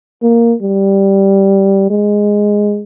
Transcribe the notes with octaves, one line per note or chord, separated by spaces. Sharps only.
A#3
G3
G#3